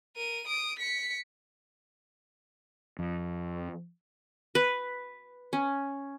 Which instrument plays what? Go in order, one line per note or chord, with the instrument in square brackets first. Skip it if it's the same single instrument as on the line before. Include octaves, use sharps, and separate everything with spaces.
[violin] A#4 D#7
D#6 D7
B6 C#7
[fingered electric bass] F2
[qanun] B4
C#4